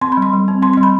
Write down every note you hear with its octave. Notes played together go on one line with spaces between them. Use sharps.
C4 C6
B5
G3 C6
G3
C4
C4 C6
C6
G3
B5